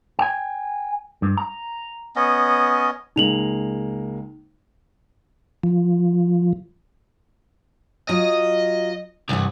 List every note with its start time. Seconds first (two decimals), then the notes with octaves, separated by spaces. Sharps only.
0.19 G5 G#5
1.22 G2
1.37 A#5
2.16 B3 C#4 D#5
3.16 C#2 G#3 A#3 D#4 F7 F#7
5.64 F3
8.09 F#3 F4 D#5
9.29 C2 G2 E3 F#5